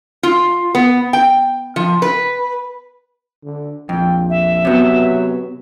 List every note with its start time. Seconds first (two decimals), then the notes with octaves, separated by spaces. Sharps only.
0.23 F4
0.75 B3
1.13 G5
1.76 F3
2.02 B4
3.44 D3
3.89 A#1 F2 G5
4.30 E5
4.65 C3 F#3 B3